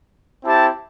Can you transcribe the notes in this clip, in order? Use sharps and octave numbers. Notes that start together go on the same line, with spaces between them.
C4 E4 G4 A5